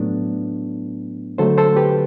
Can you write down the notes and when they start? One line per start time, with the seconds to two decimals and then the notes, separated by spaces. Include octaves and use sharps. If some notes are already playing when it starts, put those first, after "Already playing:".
Already playing: A2 F#3 A3 B3 D4
1.38 D3 F#3 A3 A4 C5
1.58 A4 C5
1.76 G4 B4